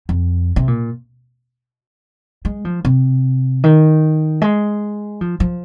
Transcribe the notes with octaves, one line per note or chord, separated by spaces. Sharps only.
F2
C3
A#2
G#3
F3
C3
D#3
G#3
F3
F3